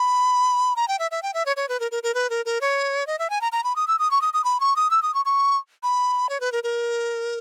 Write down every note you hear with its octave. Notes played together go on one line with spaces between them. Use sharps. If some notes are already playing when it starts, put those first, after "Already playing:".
Already playing: B5
A#5
G5
E5
E5
G5
E5
C#5
C#5
B4
A#4
A#4
A#4
B4
A#4
A#4
C#5
D#5
E5
G#5
A#5
A#5
B5
D#6
E6
D#6
C#6
D#6
D#6
B5
C#6
D#6
E6
D#6
C#6
C#6
B5
C#5
B4
A#4
A#4